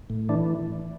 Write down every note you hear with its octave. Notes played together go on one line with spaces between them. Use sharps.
A2
E3 D4